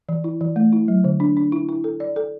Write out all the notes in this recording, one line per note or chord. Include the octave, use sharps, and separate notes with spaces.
E3
E4
E3
A3
E4
F#3
D3
D4
D4
E4
E4
A4
D5
A4